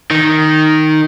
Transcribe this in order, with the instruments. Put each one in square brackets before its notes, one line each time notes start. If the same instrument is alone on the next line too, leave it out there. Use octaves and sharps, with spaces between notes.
[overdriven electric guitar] D#3